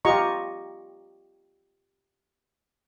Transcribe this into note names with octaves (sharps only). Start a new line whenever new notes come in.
F4 G4 D#5 A#5 C#6